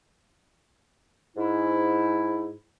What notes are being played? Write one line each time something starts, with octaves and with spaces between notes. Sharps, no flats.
G#2 E4